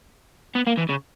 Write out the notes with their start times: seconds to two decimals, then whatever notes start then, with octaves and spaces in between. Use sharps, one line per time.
0.55 B3
0.67 A#3
0.78 E3
0.89 C#3